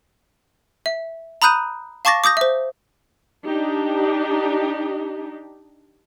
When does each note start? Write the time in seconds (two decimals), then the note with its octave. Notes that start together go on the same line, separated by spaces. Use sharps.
0.86 E5
1.42 A#5 B5 D#6 F#6 G6 D#7
2.05 F5 A5 C#6 D6 A6 A#6
2.24 D6 D#6 G6 A#6
2.37 C5 E5
3.47 D4 D#4 G4